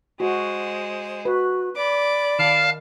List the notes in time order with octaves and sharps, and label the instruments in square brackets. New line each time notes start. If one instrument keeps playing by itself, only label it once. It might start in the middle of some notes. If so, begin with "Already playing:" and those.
[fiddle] G#3 C5 [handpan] F#4
[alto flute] F#4 [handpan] B4
[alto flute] D5 [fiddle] B5 D6
[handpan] D#3 [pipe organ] F5 A5 F6